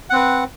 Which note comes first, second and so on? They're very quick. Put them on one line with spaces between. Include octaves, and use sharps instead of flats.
F#5 C4 B4